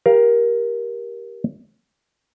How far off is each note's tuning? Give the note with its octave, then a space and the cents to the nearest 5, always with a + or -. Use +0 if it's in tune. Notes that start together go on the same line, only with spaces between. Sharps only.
G4 +0 A#4 +15 F5 +0